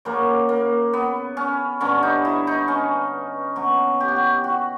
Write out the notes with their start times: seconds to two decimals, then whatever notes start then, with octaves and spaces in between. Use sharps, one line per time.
0.05 F#2 C#3 F#3 A#3
0.49 A#3
0.93 B3
1.37 C#4
1.80 G2 D3 F#3 C#4
2.03 D#4
2.25 E4
2.47 D#4
2.68 C#4
3.56 B2 F#3
4.00 G4
4.08 F#4
4.16 G4
4.44 F#4